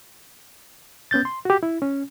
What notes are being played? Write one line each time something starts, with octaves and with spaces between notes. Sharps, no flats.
B3 C#4 G6 A6
C6
F#4 G4
E4
C#4